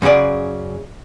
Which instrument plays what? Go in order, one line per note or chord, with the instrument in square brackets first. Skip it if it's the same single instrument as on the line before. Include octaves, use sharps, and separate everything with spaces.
[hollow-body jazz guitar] F#2 C#3 F#3 G#4 D5